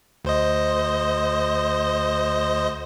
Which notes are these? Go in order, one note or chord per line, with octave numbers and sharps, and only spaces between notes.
D2 C5 D#5